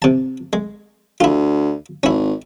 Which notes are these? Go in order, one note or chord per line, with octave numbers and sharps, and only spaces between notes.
C3 A5
G#3
D2 E4 F4
G#1 C#4 E4